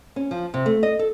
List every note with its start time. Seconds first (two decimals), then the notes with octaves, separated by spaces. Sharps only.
0.16 C#4
0.31 F3
0.54 C3
0.66 A3
0.83 D#5
0.99 A4